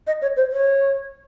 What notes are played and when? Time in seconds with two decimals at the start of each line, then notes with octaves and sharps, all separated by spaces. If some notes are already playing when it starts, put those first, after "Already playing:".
0.07 D#5
0.22 C#5
0.37 C5
0.52 C#5